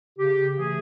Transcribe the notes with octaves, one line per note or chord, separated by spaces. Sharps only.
C#3 G4
E3 A3 G#4